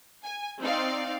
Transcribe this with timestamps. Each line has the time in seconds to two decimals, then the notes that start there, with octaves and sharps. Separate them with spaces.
0.24 G#5
0.61 C4 D#4 D5 F5